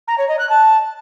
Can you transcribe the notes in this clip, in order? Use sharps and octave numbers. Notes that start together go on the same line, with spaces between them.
A#5
C#5
D#5
F#6
A5